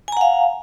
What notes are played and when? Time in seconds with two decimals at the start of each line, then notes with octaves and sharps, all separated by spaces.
0.08 G#5
0.12 A#5
0.17 F#5
0.21 F5